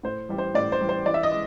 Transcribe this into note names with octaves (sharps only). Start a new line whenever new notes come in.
A2 C5
E3 G3
C5
A2 D5
C5
E3 G3
C5
E3 D5
E5
D#5
G#3